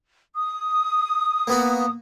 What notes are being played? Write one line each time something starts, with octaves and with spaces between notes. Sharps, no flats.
D#6
A#3 B3 F#4